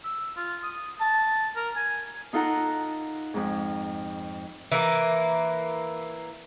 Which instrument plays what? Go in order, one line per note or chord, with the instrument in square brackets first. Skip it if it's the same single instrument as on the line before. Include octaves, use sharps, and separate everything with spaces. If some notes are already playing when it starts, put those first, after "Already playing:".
[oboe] E6
F4
D#6
A5
A#4
G#5
[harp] D#4 F4 A4 F#5 A#5
F2 G#2
[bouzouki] E3 A#3